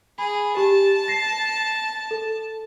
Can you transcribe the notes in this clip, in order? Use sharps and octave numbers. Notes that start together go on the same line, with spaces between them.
G#4 B5
G4 A5
A#6 C7
A4